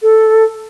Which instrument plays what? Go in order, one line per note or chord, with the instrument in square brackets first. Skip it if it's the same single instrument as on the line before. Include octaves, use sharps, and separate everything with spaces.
[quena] A4